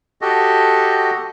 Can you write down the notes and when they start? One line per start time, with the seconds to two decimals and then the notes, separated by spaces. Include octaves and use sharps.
0.22 F#4 G4 A4 D#5